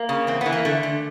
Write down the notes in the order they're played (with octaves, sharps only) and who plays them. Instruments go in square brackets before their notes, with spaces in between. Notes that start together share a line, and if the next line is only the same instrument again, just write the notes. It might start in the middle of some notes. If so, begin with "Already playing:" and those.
Already playing: [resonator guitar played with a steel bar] A#3
C#3
E2 C4
E3 B3
A#3
D3 A3
D3